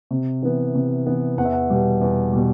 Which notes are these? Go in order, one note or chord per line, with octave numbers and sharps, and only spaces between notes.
C3
E3 B3
C3
E3 B3
E2 F#5
E5
F#5
B2 G3
E2
B2 G3